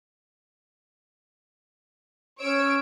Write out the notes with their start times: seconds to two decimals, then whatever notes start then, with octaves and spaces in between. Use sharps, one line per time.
2.40 C#4 C#5 E6 D7